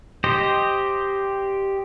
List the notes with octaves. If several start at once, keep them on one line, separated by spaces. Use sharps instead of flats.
G4 C5 D#5